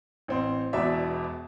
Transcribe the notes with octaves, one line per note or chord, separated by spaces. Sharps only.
A1 C4 C6
E1 E2 B2 D5 E5